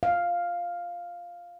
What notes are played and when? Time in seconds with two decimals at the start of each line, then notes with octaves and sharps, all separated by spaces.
0.03 F5